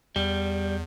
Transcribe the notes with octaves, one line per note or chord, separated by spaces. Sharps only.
E2 G3